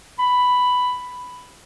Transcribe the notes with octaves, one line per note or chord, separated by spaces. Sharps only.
B5